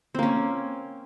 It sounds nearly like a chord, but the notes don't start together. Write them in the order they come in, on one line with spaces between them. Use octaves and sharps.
C4 A#3 C#4